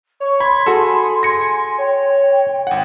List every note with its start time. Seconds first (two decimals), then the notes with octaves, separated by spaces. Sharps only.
0.20 C#5 C#6
0.40 B5 C6 G#6
0.66 F#4 G#4 A4
1.23 G#5 A#6 C#7
1.78 C#5 G5
2.67 G#1 F#5